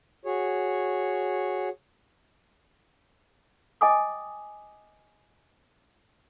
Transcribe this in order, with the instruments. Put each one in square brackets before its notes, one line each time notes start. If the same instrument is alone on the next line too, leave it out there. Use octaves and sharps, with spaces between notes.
[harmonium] F#4 G#4 C#5
[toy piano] D#5 G5 G#5 D6 D#6